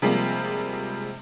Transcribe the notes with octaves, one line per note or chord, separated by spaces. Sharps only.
C3 F3 G3 G#3 A#3